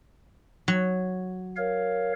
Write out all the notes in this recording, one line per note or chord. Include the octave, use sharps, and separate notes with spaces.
F#3
A#4 C#5 F5